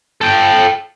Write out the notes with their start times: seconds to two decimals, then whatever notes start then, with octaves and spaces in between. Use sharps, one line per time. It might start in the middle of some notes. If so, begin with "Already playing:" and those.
0.21 A4 G5